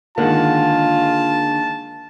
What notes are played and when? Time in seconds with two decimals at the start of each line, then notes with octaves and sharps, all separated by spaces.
0.18 D3 D#3 G#3 A#3 F4 A#4 F#5 A5